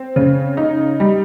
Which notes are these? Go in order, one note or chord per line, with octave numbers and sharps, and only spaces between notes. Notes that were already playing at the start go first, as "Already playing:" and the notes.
Already playing: C4
C#3
D#4
G3